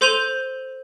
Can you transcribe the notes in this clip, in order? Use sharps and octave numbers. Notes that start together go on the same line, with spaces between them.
A4 C5 C6 G6 D#7 F7